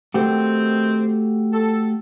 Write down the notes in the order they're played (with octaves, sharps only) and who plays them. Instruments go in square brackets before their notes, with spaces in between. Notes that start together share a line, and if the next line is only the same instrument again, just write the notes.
[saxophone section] D#3 C4 [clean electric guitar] A3 F#4 G4
[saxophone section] A4